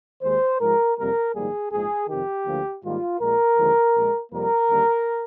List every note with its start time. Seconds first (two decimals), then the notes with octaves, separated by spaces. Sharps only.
0.23 D#2 D#3 G#3 C5
0.60 G#2 F3 G#3 A#4
0.97 F2 C3 G3 A#3 A#4
1.34 A#1 G#2 D#3 G3 A#3 G#4
1.71 A#1 G#2 F3 G#3 G#4
2.08 F2 C3 D#3 G4
2.46 D2 D3 F3 A#3
2.84 G#2 D#3 G3 A#3 F4
3.20 A#1 A#2 G#3 A#4
3.58 D#2 D3 F3 G#3
3.95 A#1 A#2 G#3
4.32 F2 C3 G3 A#3 A#4
4.69 D#2 D3 G3 A#3